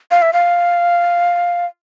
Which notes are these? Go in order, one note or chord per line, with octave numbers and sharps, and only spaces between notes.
F5
E5
F5